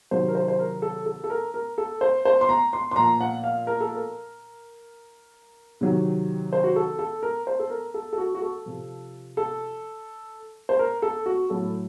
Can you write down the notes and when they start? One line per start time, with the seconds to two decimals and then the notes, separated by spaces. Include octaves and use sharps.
0.11 C3 D#3 F#3 C5
0.28 A#4
0.35 C5
0.48 C5
0.59 A#4
0.82 A4
1.06 A4
1.24 A4
1.30 A#4
1.54 A#4
1.78 A4
2.01 C5
2.25 C5
2.41 C6
2.49 A#5
2.73 C6
2.91 C6
2.96 A#2 F3 A#5
3.21 F#5
3.44 F5
3.67 A#4
3.81 A4
3.95 A#4
5.81 C3 D#3 F#3
6.53 C5
6.64 F#4
6.76 A4
6.99 A4
7.23 A#4
7.47 C5
7.59 A4
7.70 A#4
7.94 A4
8.13 A4
8.18 F#4
8.35 F#4
8.42 A4
8.66 C3 F3
9.37 A4
10.69 C5
10.79 A#4
11.02 A4
11.26 F#4
11.50 A2 F#3 A4